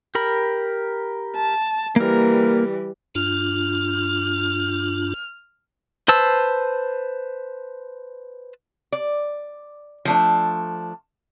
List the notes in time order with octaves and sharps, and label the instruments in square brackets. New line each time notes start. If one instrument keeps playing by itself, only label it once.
[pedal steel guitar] G4 A#4 B5
[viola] A5
[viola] E3 G3 [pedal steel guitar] A#3 A#4
[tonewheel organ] G2 D4 F4 [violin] F6
[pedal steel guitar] B4 C5 A5 E6
[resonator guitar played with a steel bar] D5
F3 A3 D4